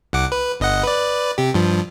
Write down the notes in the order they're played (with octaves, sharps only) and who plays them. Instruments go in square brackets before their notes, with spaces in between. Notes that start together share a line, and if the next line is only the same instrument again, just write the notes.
[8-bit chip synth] C2 F#5 D6
B4
G1 D#5 F#5
B4 D5
C3 G4
G2 F3